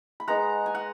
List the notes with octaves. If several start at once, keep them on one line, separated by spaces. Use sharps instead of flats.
B5
G#3 B3 D#4 F#5 A#5
G#5
F#5